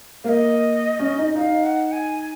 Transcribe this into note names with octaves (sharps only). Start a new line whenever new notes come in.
A#3 D#5 F5
C#4
D#4
D#4 F5
F#5
G#5
G#5